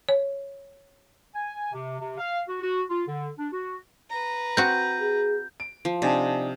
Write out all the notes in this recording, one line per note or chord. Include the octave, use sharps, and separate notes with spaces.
C#5
G#5
C3
C3
F5
F#4
F#4
F4
D3
D4
F#4
B4 A#5
C4 F#4 G6
G#4
D7
F3
C3 C4 D4 D#4 D5 G#5 A5